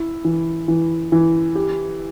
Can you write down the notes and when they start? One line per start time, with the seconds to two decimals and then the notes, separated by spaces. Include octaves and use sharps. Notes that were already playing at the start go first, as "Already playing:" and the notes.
Already playing: E4
0.25 E3
0.68 E3
1.12 E3
1.55 G4